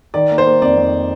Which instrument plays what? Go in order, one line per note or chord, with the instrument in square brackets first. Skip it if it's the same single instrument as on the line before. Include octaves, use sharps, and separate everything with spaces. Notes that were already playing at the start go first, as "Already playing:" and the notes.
[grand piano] D#3 [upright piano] D5
[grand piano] A#3
[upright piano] C5
[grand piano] A#3
[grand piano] F2 [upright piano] D5
[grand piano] F2